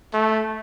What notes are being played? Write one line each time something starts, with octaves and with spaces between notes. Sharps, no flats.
A3